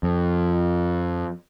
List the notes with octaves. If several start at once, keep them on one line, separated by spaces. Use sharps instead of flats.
F2